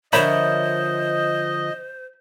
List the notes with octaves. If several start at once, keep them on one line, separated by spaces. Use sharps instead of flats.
D3 F3 A#4 C5 C#5 D#5 E5 B5